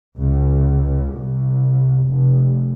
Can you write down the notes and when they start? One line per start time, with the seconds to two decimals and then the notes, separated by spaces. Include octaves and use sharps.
0.18 C#2
1.13 C2
2.06 F1